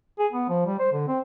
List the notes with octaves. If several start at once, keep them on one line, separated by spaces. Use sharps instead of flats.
G#4
B3
F3
G3
C5
D3
C4